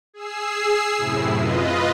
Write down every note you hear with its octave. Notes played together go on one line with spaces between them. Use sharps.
G#4 E6 C7
F#2 A2 C3 E4
F4 B4 D#5